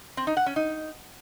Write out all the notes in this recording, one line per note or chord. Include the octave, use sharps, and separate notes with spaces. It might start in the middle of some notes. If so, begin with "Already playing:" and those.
C4
D#4
F#5
C#4
D#4